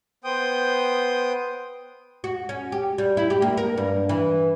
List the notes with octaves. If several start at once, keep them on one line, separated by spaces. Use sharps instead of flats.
B3 C5 G5 D#6
F#4
C#4
G4
G3
E4
G4
A#3
A#4
G2
E3